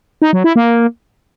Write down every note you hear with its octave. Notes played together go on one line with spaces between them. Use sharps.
D#4
F#3
E4
A#3